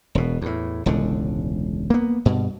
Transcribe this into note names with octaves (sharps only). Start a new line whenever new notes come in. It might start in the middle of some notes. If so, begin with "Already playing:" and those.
E1 B2
E2 A2
E1 C#2 A2 D3
A#3 B3
G2 B2